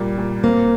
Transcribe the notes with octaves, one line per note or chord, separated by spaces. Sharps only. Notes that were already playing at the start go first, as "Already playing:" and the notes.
Already playing: A#2 G3
A#2
A#3 C4